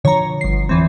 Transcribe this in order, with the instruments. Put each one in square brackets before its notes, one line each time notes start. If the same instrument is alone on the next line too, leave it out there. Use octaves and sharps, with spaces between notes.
[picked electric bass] D3 F3 [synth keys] C#5 A#5
[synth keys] G1 C7
E2 E3 C4